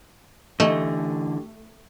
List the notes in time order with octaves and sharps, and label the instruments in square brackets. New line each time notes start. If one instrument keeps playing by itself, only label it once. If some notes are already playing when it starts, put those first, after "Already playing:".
[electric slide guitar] D3 E3 [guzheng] A3 [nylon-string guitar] G4 D#5